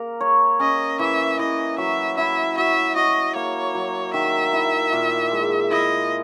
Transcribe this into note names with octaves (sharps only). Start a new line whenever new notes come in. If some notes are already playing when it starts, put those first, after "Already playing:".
Already playing: A#3 A#4
C#5
C#4 D#5
E3 E5
E3 D#5
F#3 E5
E4 E5
F#4 E5
F#4 D#5
A#3 C#5
F#3
D#3 E5
E4
A#2
G#3
E4 D#5